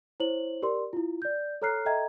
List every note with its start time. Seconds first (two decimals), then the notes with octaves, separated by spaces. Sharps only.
0.20 E4 C5 C#5 F#7
0.62 G4 A#4 D5 C6
0.93 E4 F4
1.22 D5 G6
1.62 A4 C#5 A#5 F6 F#6 C7
1.85 A4 D#5 E5 G5 A#5 G#6